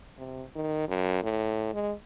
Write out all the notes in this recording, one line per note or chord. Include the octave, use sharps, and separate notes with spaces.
C3
D#3
F#2
A2
G#3